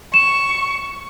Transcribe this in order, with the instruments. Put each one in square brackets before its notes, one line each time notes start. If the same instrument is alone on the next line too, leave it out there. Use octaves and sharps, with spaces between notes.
[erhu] C#6 [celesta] E7